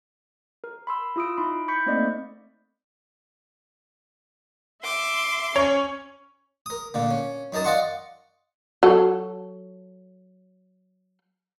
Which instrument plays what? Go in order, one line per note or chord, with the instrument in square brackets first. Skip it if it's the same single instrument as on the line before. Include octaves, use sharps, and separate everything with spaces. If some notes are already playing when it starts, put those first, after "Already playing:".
[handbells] A#4
B5 C6 E6
E4 F4 D#6 E6 D7
D#4 E4 B5 C6
B5 C#6 G6 B6 C#7
A3 A#3 C4 D#4 D5 D#5
[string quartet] E5 C6 D6
[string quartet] C#4 [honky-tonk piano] C#5
[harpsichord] A#4 D#6
A#2 D3 A#3
C#4
F#2 D#4 A#4 A5 D#6
D5 D#5 F5 F#5 C6 C#6
[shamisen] F#3 A4